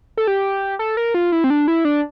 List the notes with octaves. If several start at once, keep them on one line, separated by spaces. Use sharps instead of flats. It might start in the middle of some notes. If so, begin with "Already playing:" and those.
A4
G4
A4
A#4
F4
E4
C4
D4
E4
D4